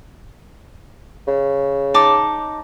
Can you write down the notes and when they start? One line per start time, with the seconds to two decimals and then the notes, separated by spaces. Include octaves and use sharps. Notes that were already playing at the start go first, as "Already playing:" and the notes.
1.27 C#3
1.94 D#4 A5 D6